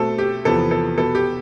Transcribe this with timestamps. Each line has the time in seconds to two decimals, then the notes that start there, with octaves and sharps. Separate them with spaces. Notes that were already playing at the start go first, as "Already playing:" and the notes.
Already playing: B2 A3 C4 A4
0.18 G4
0.45 E2 C3 F3 B3 A4
0.71 A4
0.97 B2 B3 A4
1.15 G4